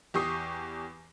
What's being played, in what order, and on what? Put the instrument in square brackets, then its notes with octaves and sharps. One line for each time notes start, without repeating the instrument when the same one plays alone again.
[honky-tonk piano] E2 G4 C#6 D#6 C7